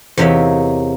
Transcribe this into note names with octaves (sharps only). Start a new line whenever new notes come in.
E2 C3 A#3 D#4 C#5 E5